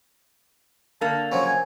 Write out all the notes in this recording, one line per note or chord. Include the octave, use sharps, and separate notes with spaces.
D3 A#3 A5
C#3 F3 F#3 C#5
G#5